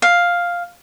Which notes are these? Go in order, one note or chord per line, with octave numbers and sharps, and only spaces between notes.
F5